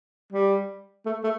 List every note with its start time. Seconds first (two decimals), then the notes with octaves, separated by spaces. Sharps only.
0.32 G3
1.05 A3
1.23 A3